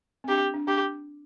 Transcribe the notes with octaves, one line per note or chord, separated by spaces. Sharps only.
C4
D4 G4
D4
D4 G4